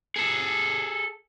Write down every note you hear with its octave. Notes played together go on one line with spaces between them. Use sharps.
G#4 A4